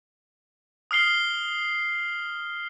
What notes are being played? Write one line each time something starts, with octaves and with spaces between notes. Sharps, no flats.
D#6 F6 C7 G7